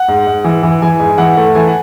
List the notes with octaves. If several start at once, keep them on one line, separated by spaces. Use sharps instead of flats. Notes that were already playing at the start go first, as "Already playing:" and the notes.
Already playing: F#5
G#2
G#2
E3
E3
E3 G#5
G#2
E3 F#5
A3
E3 G#5
F#5